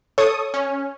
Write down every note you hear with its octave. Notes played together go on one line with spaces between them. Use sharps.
A4 C#5 C#6 D#6
C#4